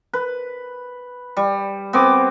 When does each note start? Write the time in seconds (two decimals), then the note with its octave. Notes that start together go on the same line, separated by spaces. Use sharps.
0.13 B4
1.37 G3
1.93 B3 C4 D6